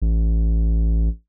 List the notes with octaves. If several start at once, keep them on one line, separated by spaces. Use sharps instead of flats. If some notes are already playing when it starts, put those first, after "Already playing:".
A1